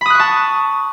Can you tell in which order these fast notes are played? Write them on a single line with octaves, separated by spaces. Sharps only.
B5 D#6 F#6 C#6 A5